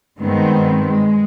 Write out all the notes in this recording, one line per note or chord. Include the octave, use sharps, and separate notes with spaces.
G2 D#3 G#3 B3 C4
G#3